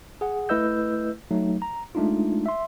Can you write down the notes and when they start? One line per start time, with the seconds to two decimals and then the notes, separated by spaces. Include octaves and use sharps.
0.21 G#4 F#5
0.49 A3 E4 B4 D#5 E6 G6
1.31 F#3 A3 D#4
1.62 A#5
1.95 G#3 A3 D4 D#4 F4
2.46 E5 C6